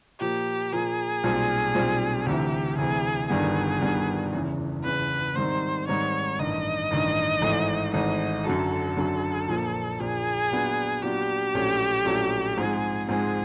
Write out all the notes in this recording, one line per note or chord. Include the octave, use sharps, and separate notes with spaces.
A#2 F3 A#3 G4
A#2 F3 A#3 G#4
B1 A#2 G3 C4 F4
B1 A#2 G3 C4 F4
D2 C3 E3 G4
D2 C3 E3 G#4
G1 G2 D#3 G3 B3 G#4
G1 G2 D#3 G3 B3
F#1 E2 C#3 E3
F#1 E2 C#3 E3 B4
G#2 D#3 G3 C4 D#4 C5
G#2 D#3 G3 C4 D#4 C#5
A1 G2 D#3 D#5
A1 G2 D#3
G#1 G#2 E3 A3
G#1 G#2 E3 A3 D#5
F#2 D3 F#3 A4
F#2 D3 F#3
A#1 A#2 F3 A#3
A#1 A#2 F3 A#3 G#4
A#2 F#3 B3 D4 F4
A#2 F#3 B3 D4 F4 G4
A#1 A2 F#3 A3 C#4
A#1 A2 F#3 A3 C#4
G#2 F3 G#3 C4 G#4
G#2 F3 G#3 C4 G#4